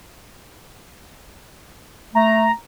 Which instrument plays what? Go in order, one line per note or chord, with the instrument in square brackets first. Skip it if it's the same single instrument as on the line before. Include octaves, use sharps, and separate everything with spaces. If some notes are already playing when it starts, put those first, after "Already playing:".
[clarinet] A3 [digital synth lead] A#5